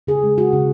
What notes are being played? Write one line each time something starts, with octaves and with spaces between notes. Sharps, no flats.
C#3 G#4
G#3
G#3 F#4
C#3